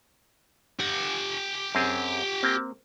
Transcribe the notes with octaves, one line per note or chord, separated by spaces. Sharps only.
G4 F#5
F#2 C4 G#4
A#3 C4